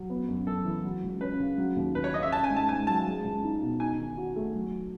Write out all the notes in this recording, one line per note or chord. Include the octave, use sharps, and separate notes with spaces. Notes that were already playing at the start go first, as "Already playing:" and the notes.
Already playing: F#3
B3
F#2
F#2 A4
E3
F#3
C#2
C#4 B4
C#3
F#3
D#2
D#2 B4
C#5
C#3 D#5
E5
C#4 A5
G#5
G#2
A5
G#2 G#5
F#3 A5
G#3
C#2
D#4
B2
D#4 G#5
D#3
F#4
A3
F#3